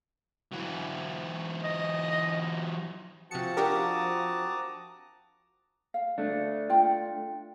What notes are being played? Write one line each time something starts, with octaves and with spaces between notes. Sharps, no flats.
E3 F#3
D#5
C3 F3 C4 F#4 G#4 A5 C#7
D4 G4 A#4 A#5 D6 D#6
F5
A3 D4
F4 G5